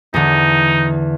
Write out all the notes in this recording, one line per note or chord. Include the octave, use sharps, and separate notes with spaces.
E2 D3 D#4